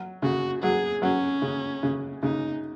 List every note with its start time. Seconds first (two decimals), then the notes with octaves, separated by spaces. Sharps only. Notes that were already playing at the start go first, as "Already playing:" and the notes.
Already playing: F#3
0.22 C#3 F#4
0.62 F#3 G#4
1.02 F#3 C#4
1.42 C#3
1.83 C#3
2.23 C#3 D#4